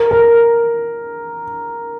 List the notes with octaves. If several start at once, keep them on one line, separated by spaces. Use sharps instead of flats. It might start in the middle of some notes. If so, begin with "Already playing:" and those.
Already playing: A#4
A#4